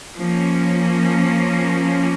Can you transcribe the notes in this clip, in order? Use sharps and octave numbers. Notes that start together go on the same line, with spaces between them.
F3 A#3 C#4